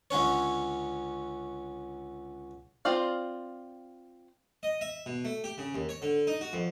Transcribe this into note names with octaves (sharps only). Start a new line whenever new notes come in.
C#2 D3 C#4 C#5
C4 F4 C5 D5 F5
D#5
E5
B2
A3
G4
C#3
D#2
C#5
D3
D#4
F#4
F2